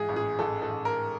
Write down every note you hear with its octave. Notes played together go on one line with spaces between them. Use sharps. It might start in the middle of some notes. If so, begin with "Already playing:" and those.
Already playing: G#2 E3 G#4
A1
G#4
A1 A4
A4
A1
A#4